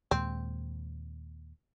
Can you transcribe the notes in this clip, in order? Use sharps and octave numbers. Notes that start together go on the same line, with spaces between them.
D#2 A#2 G#3 C4